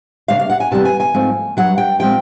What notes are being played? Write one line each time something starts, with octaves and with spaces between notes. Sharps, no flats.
C#3 F3 A#3 D4 F5
F5
F#5
G#5
F2 C3 E3 G3 B3 A5
G#5
G#5
G#2 F3 A3 C4
G2 D#3 F#3 F#5
G5
A#2 F3 G#3 C4 G5